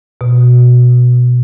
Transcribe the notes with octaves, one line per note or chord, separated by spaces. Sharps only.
B2